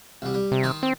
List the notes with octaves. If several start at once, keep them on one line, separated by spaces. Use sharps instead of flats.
C2 G3
G3
C3
D#3 D#4 C6
C4